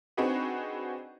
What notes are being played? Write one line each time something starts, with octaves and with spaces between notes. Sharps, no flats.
C4 D4 D#4 F#4 G#4 B4